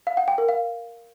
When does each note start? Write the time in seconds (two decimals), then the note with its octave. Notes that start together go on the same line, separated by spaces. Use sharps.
0.07 F5
0.17 F#5
0.28 G5
0.38 A#4
0.49 F5